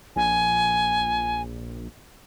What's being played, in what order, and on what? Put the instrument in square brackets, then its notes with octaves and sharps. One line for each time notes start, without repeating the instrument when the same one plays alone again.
[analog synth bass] A#1 [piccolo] G#5